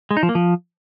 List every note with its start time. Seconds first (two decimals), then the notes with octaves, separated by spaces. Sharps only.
0.11 G#3
0.17 D#4
0.23 F3
0.29 A#3
0.35 F3